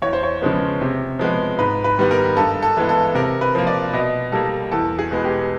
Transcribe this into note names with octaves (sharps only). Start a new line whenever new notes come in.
E2 C#5
C5
C#5
C#3 F3 G#3 B3
C3
F3 G#3 B3
G#2 B4
B4
D#3 G3 B3
A#4
G2 A4
A4
E3 G#3 B3
A4
C3 A#4
B4
F3 A#3
D5
B2 D#5
G3 A#3 A4
E2 A4
G#4
B2 G#3 B3
G4